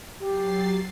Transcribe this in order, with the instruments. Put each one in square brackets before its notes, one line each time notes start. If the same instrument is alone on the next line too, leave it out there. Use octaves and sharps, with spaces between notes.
[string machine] F#3 A6 C7 [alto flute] G4